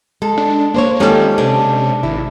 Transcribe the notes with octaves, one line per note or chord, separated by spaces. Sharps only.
G#3 A4
D4
A#3 D4 C5 C#5
D#3 F3 G3 G#3 C#4 A4
C3 D4
G#1 E4